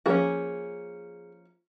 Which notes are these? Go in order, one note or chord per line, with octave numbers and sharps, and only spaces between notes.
F3 A#3 C#4 F#4 G#4